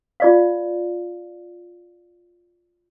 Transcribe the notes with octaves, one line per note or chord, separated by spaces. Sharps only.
F4 D5 F5